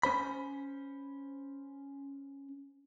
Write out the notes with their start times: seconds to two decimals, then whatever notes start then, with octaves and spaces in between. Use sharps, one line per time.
0.03 C#4 C5 B5